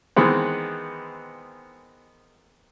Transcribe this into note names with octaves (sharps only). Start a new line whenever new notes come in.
D#3 E3 G#3 B3 C4